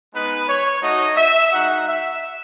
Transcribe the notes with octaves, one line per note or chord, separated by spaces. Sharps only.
G#3 B3 D#4 B4
C#5
A3 D#4 F#4 D#5
E5
G#3 D#4 F#4 F#5
E5